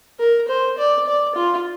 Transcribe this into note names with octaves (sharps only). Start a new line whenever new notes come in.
A#4
C5
D5
D5
F4